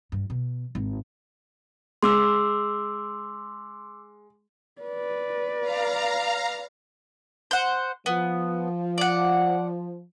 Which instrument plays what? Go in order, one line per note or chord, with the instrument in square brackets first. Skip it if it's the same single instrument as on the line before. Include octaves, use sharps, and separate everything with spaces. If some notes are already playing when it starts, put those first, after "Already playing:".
[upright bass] G2
B2
G#1
[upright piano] G#3 [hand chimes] C6 D6 E6
[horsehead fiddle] B4 D5
[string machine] F5 A#5
[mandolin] C5 F#5
[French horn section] F3 [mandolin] B3
[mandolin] D5 F#5